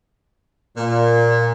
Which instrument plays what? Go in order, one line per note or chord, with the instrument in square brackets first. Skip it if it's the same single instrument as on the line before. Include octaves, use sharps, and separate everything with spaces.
[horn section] A#2